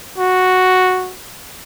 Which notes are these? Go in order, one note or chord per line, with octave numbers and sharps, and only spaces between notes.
F#4